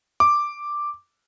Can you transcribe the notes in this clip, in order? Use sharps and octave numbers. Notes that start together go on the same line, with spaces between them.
D6